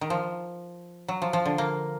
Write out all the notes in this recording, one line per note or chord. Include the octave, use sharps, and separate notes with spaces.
D#3
F3
F#3
F3
F3
D3
A#3